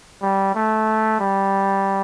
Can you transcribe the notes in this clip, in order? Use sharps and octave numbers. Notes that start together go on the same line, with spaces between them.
G3
A3
G3